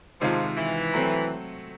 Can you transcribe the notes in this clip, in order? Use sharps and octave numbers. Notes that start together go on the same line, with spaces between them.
C3 D#3 F3 G#3 C4 F4
E3
F#3 A3 C4